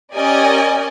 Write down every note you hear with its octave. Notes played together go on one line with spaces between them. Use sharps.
C#4 G4 A#4 D5 D#5 G#5